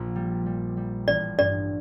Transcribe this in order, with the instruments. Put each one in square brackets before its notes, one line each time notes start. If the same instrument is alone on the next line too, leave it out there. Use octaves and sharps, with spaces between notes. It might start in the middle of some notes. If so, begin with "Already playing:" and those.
Already playing: [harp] A#1 A#2
G3
G3
G3
[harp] A1 [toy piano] D5
[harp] G2 [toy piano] D5